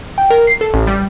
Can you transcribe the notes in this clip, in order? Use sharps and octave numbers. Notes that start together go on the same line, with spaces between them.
G5
A#4
C7
A4
A1
G3